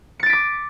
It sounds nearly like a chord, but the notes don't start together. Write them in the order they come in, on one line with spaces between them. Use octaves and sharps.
C#7 A6 D7 B6 D6